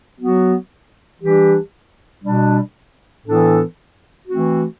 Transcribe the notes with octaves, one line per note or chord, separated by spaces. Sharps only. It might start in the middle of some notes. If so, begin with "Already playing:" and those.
F#3 B3 F#4
E3 G3 D4 G4
B2 G3 D4
A2 E3 B3 D4 A4
E3 A3 C4 F#4